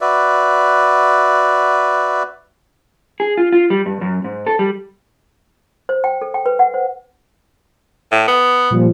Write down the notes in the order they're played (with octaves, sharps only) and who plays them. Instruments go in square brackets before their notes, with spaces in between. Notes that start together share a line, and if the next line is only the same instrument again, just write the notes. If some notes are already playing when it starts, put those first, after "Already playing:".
[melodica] F#4 B4 D5 E5
[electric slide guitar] G#4
F4
F4
G3
G2
F#2
G#2
A4
G3
[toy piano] C5
G5
A4
G5
B4
F#5
C5
[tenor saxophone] A2
B3
[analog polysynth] A#2 F3 G3